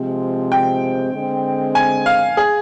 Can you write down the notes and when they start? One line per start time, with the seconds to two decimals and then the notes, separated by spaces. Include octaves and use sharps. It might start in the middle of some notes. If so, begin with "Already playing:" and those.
Already playing: C3 F3 G#3 C4
0.52 G5
1.13 D3 G#3 C4
1.75 G#5
2.06 F5
2.37 G#4